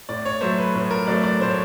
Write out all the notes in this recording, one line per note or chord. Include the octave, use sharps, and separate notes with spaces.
A2 D5
C#5
F#3 A3 C5
B4
A2 B4
A#4
F#3 A3 D5
D5
A2 C5
C#5